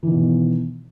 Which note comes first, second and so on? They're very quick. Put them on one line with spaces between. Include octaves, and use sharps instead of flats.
E3 D#3 B2